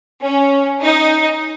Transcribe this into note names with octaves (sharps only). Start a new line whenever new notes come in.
C#4
D#4